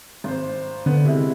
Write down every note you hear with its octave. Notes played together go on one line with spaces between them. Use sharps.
G#1 C5
D3 B3
C3 G#3 E4